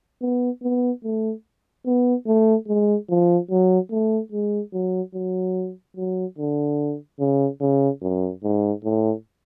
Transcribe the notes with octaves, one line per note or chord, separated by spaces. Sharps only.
B3
B3
A3
B3
A3
G#3
F3
F#3
A3
G#3
F#3
F#3
F#3
D3
C#3
C#3
F#2
G#2
A2